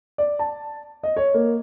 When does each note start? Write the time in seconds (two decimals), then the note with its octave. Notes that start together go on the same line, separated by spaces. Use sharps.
0.18 D5
0.39 A5
1.03 D#5
1.17 C#5
1.34 A#3